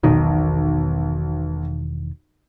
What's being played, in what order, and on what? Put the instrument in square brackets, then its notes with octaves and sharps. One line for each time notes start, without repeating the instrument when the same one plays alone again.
[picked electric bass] E1 D#3 [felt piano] B1